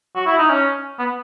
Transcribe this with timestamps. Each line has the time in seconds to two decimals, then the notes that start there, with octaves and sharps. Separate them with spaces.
0.16 F#4
0.26 E4
0.38 D#4
0.50 C#4
0.99 B3